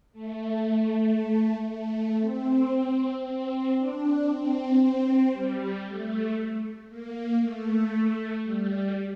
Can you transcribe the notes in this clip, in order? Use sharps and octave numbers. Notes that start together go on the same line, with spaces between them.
A3
A3
C4
C4
D4
C4
C4
G3
A3
A#3
A3
G3